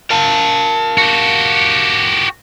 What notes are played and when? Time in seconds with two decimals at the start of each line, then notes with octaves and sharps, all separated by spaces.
0.10 A#4 F5 A5
0.98 F#4 G4